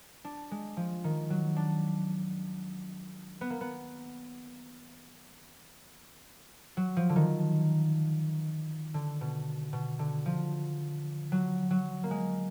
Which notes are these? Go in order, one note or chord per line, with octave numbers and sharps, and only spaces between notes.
D4
G#3
F3
D#3
F#3
D4
B3
A#3
B3
F#3
F3
D3
D#3
D3
B2
B2
D3
F3
F#3
F#3
A#3
G#3